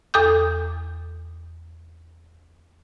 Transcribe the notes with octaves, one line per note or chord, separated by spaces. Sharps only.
E2 A4 D6 D#6 G6